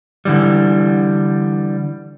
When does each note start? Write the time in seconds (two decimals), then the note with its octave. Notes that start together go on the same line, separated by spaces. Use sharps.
0.25 D3 E3 G3